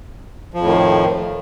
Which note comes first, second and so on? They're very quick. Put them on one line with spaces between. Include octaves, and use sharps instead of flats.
F3 F2 A2 D#3